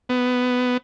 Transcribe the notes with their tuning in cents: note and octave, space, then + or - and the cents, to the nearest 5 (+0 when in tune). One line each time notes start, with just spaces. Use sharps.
B3 +15